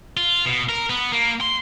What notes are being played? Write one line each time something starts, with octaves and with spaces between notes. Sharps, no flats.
F4
B2
A#4
B3
A#3
C6